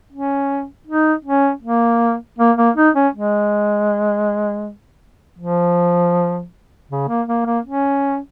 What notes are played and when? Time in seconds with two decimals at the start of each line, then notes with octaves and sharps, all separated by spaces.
0.13 C#4
0.87 D#4
1.25 C#4
1.63 A#3
2.39 A#3
2.57 A#3
2.76 D#4
2.95 C#4
3.14 G#3
5.39 F3
6.91 C#3
7.09 A#3
7.28 A#3
7.46 A#3
7.65 C#4